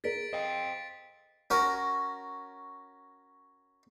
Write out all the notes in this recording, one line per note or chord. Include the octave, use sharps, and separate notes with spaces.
G#4 A#4 A6 B6 D7
C5 D#5 F5 G5
C#4 F#4 A#4